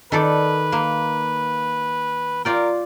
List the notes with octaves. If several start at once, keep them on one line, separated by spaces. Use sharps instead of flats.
D#3 A4 B4 D5
A#3
F4 A#4 D5 G5